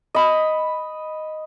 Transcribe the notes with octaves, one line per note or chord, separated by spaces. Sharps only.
D#5 B5